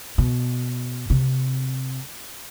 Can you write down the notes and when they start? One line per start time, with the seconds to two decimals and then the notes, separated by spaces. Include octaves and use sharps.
0.18 B2
1.10 C3